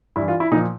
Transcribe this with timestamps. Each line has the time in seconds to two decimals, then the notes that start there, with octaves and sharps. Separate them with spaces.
0.16 G2 E3 E4
0.28 F4
0.40 E4
0.52 A#2 F3 D#4